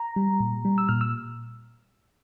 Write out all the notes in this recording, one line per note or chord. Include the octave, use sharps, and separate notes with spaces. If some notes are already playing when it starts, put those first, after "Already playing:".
Already playing: A#5
G3
A#2
G3
E6
A#2 F6
E6